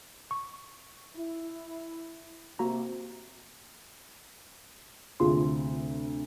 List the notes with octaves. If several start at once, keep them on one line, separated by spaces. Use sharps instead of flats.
C#6
E4
C3 A#3 F#4 A#5
D2 C3 F4 G#4 C6